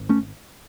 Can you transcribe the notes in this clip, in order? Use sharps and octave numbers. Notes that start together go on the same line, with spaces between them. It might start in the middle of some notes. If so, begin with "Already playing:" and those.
Already playing: G#1
A3 C#4